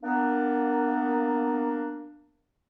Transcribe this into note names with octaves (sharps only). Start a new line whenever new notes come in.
A#3 B3 D4